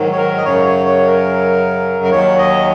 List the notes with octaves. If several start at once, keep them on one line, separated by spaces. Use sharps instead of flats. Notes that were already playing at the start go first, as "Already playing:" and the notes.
Already playing: G#2 D#3 F#3
C#5
A#4
D#5
F#2 C#3 F#3 C#5
C#5
C#5
A#4
A#4
D#2 D#3 F#3 C#5
D#5